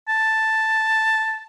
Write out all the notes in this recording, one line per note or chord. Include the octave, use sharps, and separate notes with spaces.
A5